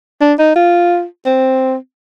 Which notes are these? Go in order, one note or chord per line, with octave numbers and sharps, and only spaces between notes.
D4
D#4
F4
C4